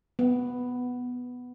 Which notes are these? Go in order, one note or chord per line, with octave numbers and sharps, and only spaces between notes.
B3